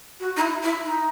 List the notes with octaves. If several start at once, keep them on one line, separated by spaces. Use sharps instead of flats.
F#4
D#4
E4
E4
D#4